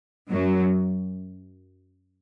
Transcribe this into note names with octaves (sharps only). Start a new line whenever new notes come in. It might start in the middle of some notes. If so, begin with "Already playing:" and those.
F#2 F#3